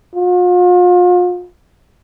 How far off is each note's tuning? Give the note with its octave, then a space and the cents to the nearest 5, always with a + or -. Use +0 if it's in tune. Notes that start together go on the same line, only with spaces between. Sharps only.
F4 +40